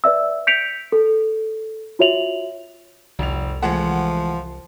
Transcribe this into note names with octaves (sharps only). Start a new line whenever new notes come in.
B4 D5 E5 E6
G6 B6 C#7 D7 F7
A4
F4 F#4 C#5 E5 F7 F#7
F1 C2 F7
E3 F3 G#3 A3 F#5